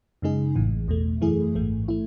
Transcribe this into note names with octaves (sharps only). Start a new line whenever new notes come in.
F#2 C#3 G#3 D#4 G#4
A1 A2 E3
E2 B2 A3
F#2 E3 A3 E4 G#4
A1 G#2 E3 A3
A3 E4